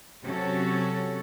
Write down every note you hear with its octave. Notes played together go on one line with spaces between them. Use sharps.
C3 F#3 C#4 F#4 A4 C#5